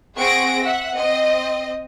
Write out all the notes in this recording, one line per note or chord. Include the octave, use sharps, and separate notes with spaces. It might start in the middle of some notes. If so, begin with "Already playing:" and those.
C4 G#4 F#5 C#6 A#6 D7
E5 F#5
C4 D#5